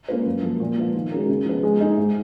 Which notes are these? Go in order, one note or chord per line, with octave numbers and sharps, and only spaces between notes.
A#3 C#4 F4 B4
F#2
F3 A#3
A#2
F3 B3 F4
D#3
G#3 C#4 F#4 A#4
C#3
F3 G#3 B3
G#3
D#4 G#4
G#2